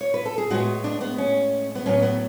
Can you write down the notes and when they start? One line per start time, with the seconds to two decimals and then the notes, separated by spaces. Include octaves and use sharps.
0.01 C#5
0.14 B4
0.26 A4
0.38 G#4
0.50 A2 G#3 B3 F#4
0.84 D4
1.01 B3
1.18 C#4
1.75 B3
1.86 A2 F#3 B3 C#4
2.02 B3